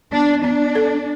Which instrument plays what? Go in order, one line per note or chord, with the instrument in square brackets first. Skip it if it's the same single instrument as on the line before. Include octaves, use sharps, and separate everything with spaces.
[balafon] B3 [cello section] D4
[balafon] B3 [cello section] D4
[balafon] A4